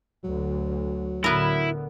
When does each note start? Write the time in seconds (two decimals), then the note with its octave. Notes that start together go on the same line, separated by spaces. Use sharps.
0.24 D2 F#3
1.24 A2 D3 B3 E4 A#4